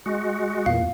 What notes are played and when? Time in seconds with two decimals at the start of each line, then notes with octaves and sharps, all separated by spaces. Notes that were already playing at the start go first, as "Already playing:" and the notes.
0.06 G#3 F#4
0.66 E2 A#2 F5